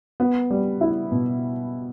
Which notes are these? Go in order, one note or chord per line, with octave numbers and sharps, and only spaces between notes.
B3
G3
E4
B2